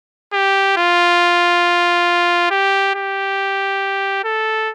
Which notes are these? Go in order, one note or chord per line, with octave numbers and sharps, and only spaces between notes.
G4
F4
G4
G4
A4